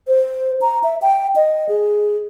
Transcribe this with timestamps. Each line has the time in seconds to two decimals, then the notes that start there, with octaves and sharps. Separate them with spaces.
0.08 C5
0.61 A#5
0.84 E5
1.02 G5
1.36 D#5
1.69 G#4